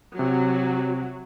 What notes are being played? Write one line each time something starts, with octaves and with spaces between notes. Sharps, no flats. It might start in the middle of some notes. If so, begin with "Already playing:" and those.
C3 F#3